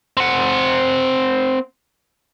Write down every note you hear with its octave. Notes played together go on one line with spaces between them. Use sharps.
C4 F#5